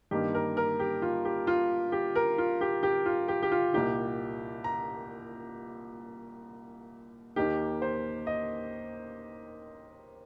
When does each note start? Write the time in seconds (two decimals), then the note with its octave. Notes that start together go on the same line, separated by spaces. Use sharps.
0.11 G2 D#3 A#3 D#4 G4
0.35 A#4
0.57 A#4
0.79 G4
1.02 F4
1.25 G4
1.47 F4
1.92 G4
2.15 A#4
2.38 F4
2.61 G4
2.83 G4
3.06 F4
3.28 G4
3.43 G4
3.51 F4
3.73 C2 A#2 A#3 D#4 G4
4.64 A#5
7.36 D#2 D#3 A#3 D#4 G4
7.82 C5
8.27 D#5